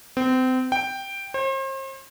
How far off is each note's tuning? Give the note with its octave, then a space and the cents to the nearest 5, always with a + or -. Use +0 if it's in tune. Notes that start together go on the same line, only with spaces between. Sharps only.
C4 -30
G5 +0
C5 +40